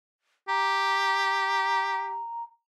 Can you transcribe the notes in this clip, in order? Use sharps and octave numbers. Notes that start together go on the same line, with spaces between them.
G4 A#5